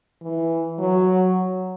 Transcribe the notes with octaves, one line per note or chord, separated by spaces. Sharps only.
E3
F#3